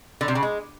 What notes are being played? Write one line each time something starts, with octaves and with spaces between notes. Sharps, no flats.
D3
C3
C#3
G#3